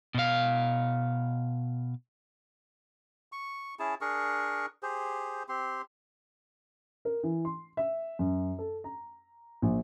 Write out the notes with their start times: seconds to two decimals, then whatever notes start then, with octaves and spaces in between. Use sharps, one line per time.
0.15 B2 F5
3.32 C#6
3.79 C#4 E4 G#4 A5
4.01 D4 G#4 A#4 C#6
4.83 G4 G#4 C5
5.49 C4 G4 C6
7.05 A#4
7.23 E3
7.45 C6
7.77 E5
8.19 F#2
8.58 A4
8.84 A#5
9.62 A#1